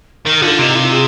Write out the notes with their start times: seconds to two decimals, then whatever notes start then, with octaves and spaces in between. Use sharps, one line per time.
0.25 D#3 A#4
0.42 D3 F4
0.59 C3 D#4
0.76 F4
0.92 G#4